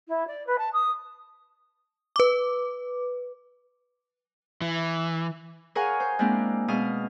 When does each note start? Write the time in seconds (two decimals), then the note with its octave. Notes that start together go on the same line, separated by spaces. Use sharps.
0.08 E4
0.27 D5
0.46 B4
0.58 A5
0.73 D#6
2.16 B4 D6
4.62 E3
5.75 G#4 A#4 C#5 F5 F#5 G#5
6.00 C5
6.19 G#3 A#3 C4 D4 E4 F5
6.68 B2 G#3 F5 D#6 F6